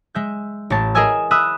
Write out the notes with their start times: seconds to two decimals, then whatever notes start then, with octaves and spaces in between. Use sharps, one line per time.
0.15 G#3 E5 G6
0.70 A1 C#5 A5
0.95 G#4 A#4 D#5 E5 G#5 E6
1.31 E5 B5 D#6 E6 F#6